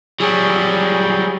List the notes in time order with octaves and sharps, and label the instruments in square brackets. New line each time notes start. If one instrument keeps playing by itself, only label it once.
[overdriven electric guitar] F#3 G3 [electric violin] G#4